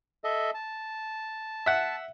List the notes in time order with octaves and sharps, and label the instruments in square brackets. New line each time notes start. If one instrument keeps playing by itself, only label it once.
[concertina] A4 D#5 E5
A5
[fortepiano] E5 F#5